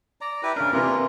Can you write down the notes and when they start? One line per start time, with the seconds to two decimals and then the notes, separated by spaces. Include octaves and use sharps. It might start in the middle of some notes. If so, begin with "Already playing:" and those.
0.21 D5 A#5
0.43 E4 G4 B4
0.56 C#3 D4 A#4
0.73 C3 E3 A#3 F4 A#4